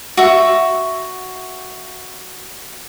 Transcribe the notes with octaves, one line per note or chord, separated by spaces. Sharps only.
F#4 E5